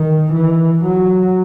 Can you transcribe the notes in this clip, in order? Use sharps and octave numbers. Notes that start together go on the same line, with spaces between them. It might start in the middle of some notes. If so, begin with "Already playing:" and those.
Already playing: D#3
E3
F#3